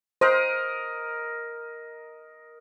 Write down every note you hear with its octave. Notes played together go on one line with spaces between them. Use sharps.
A#4 C5 D#5